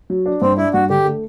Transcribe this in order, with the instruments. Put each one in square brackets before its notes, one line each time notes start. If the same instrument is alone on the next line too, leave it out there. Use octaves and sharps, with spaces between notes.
[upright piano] F#3
D4
[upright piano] G2 [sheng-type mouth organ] C4
[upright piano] D4 [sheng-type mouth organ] E4
[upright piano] G2 [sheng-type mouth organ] F#4
[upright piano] D3 [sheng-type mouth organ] G4
[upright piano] A3